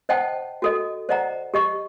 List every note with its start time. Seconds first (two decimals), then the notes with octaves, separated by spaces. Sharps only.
0.09 C5 D#5 F#5 G5 A5
0.62 F#4 A4 D#5
1.09 C5 D5 D#5 F#5 A#5
1.54 G4 D#5 C#6